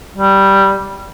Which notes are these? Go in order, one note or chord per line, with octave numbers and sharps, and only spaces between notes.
G3